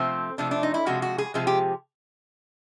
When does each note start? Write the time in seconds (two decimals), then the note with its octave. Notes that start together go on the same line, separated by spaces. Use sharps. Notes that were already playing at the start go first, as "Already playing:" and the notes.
Already playing: C3 F3 A3 C4
0.38 C3 F3 A3 D4
0.51 D4
0.63 D#4
0.74 E4
0.86 C3 F3 G#3 F#4
1.02 F#4
1.18 G#4
1.34 C3 F3 G#3 G#4
1.47 G4